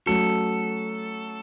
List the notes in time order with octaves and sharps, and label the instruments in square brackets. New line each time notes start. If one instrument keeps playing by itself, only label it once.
[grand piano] F#3 A3 C#4 F#4 [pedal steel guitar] A4